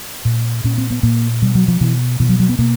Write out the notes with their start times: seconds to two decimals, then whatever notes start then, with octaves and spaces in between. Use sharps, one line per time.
0.25 A#2
0.64 A#2 C#4
0.78 C4
0.91 B3
1.03 A#2 A#3
1.42 B2 G3
1.55 F#3
1.68 F3
1.81 B2 E3
2.20 B2 E3
2.29 F#3
2.40 F#3
2.49 B3
2.59 B2 A#3